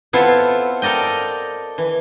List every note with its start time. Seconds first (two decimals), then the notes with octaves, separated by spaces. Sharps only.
0.13 B3 C4 E4 F4 A4 C5
0.82 A4 A#4 D5 D#5 G5
1.78 E3